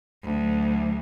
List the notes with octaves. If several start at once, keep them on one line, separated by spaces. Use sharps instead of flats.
D2 F#3